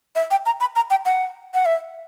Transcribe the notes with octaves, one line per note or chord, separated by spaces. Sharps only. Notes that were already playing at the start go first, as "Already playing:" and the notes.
E5
G5
A#5
B5
A#5
G5
F#5
F#5
E5